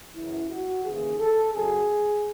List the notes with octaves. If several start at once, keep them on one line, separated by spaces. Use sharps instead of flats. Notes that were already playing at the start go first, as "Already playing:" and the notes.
F#2 C#3 E3 E4
F#4
D#2 C#3 E3 G#4
A4
F#2 C#3 F#3 G#4